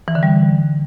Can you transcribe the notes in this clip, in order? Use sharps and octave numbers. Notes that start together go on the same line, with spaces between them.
E3
D3
G3